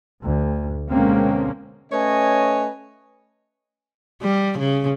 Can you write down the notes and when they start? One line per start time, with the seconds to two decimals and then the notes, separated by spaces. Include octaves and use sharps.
0.22 D2
0.92 B2 D3 G#3 A#3 C4 C#4
1.92 A3 C#4 B4 C#5 D#5 G#5
4.22 G3
4.58 C#3